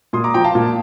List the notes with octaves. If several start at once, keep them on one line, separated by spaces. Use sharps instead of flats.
A#2 C6 D#6
A#5 D6
F3 G5 A#5
F5 A5
A#2